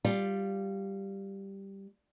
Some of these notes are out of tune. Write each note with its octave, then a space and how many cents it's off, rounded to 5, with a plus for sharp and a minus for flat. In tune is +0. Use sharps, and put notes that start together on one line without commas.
G3 +0 F4 +0 D5 +0